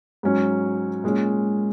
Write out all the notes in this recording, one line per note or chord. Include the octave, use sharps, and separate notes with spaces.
G#2 F#3 C#4
A#2 G#3 C#4